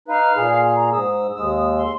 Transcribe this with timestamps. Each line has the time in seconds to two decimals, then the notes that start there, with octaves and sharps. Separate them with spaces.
0.08 D#4 B4 F5
0.36 A#2 G#4
0.76 A#5
0.92 G#2 D#6 E6
1.36 D#2 G#3 E6
1.77 C6